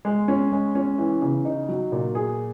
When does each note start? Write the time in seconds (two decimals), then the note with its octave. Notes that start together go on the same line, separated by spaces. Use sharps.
0.05 G#3
0.28 C#4
0.52 G#3
0.75 C#4
0.98 E3
1.22 C#3
1.45 D#4
1.69 F#3
1.92 A#2
2.15 G#4